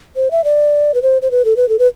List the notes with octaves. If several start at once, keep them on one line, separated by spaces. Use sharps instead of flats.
C5
E5
D5
B4
C5
C5
B4
A4
B4
A4
B4